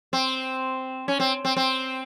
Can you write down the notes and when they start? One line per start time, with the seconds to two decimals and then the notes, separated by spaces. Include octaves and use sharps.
0.13 C4
1.08 C#4
1.20 C4
1.45 C4
1.57 C4